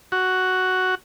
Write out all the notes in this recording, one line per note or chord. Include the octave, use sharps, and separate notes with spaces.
F#4